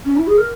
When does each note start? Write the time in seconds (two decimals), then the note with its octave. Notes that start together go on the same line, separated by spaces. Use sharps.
0.04 C#4
0.16 E4
0.27 G#4
0.37 A#4